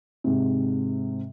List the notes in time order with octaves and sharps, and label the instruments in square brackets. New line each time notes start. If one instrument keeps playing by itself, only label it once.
[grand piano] G#2 C3